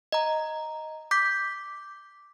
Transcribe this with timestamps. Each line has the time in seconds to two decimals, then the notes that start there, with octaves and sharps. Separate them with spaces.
0.12 D#5 A#5
1.11 D6 G6 B6